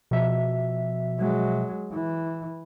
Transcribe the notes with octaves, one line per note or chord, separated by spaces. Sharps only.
B2 F3 E5
F#3 G#3
E3